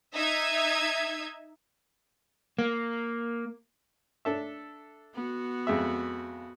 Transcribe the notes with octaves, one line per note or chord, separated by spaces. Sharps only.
D#4 E5 G#6
A#3
D4 A4 E5
B3 F#4
F2 G#3 E5